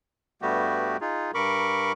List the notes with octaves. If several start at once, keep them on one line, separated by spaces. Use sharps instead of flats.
G2 G3 A3 B3 F#4 G4
D#4 F4 G#4
G2 A#4 B5 C#6 D6